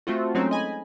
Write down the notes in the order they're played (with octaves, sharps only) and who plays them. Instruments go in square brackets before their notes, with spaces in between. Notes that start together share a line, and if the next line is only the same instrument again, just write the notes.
[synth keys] A3 C4 F4 F#4
F#3 G#3 A3 C4 C#4 D#4
D#5 G#5 B5